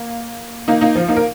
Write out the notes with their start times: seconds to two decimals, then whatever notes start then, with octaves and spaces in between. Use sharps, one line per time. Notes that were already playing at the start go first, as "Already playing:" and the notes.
Already playing: A#3
0.68 A#3 D#4
0.81 A#3 D#4
0.95 F3
1.08 A#3 D#4
1.16 A#4